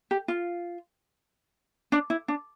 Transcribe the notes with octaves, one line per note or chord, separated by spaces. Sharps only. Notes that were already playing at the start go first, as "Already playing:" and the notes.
G4
F4
D4
E4
D4